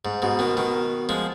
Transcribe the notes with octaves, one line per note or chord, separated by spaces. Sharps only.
G#2
G#2 B2
B2 D#3
B2 D#3
F3 G#3